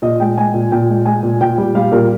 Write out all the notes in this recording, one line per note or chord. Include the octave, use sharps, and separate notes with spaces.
A#2 D#5
G#3 G5
G#3 G#5
A#2
A#2 G5
G#3
G#3 G#5
A#2
A#2 G5
G3
G3 F5
A#2 A#4